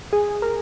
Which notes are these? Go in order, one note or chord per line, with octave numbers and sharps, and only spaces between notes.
G#4
A#4